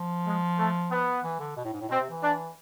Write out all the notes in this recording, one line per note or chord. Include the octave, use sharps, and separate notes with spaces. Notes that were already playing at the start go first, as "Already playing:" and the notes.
Already playing: F3
G#3
A3
B3
E3
D3
B2
A2
G#2
A2
B2 C4
C3
E3
D4